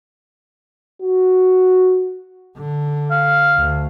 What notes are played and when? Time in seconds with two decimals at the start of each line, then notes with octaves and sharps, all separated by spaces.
1.02 F#4
2.57 D3
3.11 F5
3.57 D2